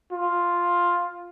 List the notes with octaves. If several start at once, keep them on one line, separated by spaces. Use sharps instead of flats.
F4